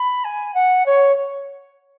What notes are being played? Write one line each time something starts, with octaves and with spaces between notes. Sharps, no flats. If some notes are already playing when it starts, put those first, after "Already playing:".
Already playing: B5
G#5
F#5
C#5